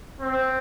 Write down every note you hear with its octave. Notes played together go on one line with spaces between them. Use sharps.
C4